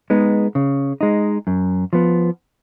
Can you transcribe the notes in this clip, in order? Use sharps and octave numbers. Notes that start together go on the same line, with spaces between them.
G#3 B3 D#4
C#3
G#3 D#4
F#2
F3 B3